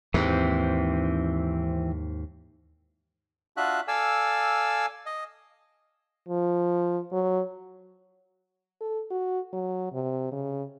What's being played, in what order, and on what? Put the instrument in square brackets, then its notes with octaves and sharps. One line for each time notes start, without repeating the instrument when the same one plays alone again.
[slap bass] D#2 G#2 [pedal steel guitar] E3 C4
[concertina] D4 F4 F#4 E5 F#6
A4 D5 F5 G#5 E6
D#5
[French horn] F3
F#3
[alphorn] A4
F#4
F#3
C3
C#3